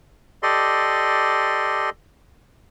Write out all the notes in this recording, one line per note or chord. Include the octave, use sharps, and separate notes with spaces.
G4 A4 D5 D#5 C6